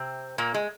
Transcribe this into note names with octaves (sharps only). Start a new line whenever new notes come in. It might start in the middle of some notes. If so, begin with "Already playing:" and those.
Already playing: C3 C4
A#2 A#3
G#3